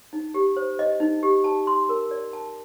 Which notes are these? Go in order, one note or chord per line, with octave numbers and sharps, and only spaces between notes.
D#4
G4
C5
D#5
D#4
G4
A5
C6
A#4
D5
A5